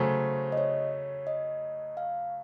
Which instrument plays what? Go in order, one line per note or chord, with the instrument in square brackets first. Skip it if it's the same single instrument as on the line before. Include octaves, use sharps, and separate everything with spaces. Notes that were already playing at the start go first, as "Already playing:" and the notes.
Already playing: [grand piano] C#3 F#3 A3 [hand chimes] C5
[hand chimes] D#5
C#5
D#5
F5